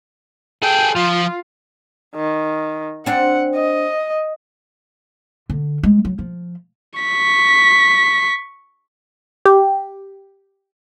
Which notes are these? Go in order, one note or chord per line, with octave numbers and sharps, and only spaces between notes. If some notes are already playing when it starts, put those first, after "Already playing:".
G#4 A4 G5
F3 F4
D#3
C4 D4 F#5
D#5
D3
G#3
F#3
F3
C#6 B6
G4